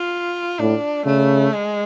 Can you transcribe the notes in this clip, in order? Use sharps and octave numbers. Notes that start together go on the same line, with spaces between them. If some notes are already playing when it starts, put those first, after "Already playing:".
Already playing: F4
A2 D4
C#3 A3
G#3